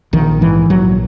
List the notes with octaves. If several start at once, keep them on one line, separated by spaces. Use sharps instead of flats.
A#1 D#3
G#2 E3
A#1 F#3